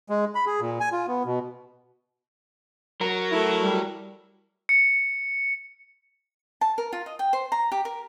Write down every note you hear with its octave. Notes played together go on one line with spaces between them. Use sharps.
G#3
B5
G#4
A#2
G#5
F4
B3
B2
F#3 A#4
A3 E4
G3
C#7
A5
A#4
F4
D#5
G5
C5
A#5
G4
A#4